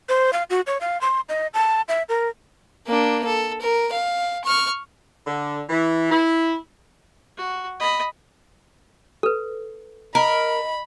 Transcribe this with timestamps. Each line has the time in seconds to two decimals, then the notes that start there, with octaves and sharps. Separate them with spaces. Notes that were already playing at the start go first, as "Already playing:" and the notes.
0.09 C5
0.33 F5
0.50 F#4
0.67 C#5
0.81 F5
1.01 C6
1.29 D#5
1.54 A5
1.88 E5
2.09 A#4
2.86 A#3 D4
3.26 A4
3.61 A#4
3.92 F5
4.44 C#6 F6
5.25 D3
5.69 E3
6.10 E4
7.37 F#4
7.80 D#5 B5
9.23 A4 B4
10.15 A#4 D#5 B5